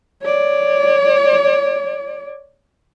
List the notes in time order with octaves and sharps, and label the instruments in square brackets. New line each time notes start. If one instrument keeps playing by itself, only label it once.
[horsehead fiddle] C#5 D5